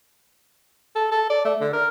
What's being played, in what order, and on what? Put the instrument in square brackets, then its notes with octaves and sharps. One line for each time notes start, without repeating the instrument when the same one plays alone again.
[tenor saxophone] A4
A4
D5
A3
D3
A#4